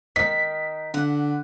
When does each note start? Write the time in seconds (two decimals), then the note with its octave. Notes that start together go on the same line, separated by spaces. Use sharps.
0.16 D#3 B6
0.94 D3 F#5